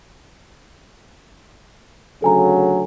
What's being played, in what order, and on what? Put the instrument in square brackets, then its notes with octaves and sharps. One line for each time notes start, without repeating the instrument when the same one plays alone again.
[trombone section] D2 C#3 F#3 [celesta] A4 G#5 A#5